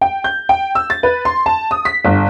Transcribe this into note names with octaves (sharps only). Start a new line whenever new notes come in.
G5
G6
G5
E6
A6
B4
C6
A5
D#6
B6
G1